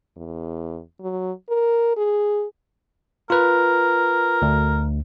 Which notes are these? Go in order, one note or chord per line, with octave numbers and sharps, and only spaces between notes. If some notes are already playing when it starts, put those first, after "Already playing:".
E2
F#3
A#4
G#4
F4 A#4 B4
D2